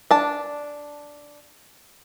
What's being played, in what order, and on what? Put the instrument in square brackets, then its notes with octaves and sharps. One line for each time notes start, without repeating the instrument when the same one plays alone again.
[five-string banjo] D4 A5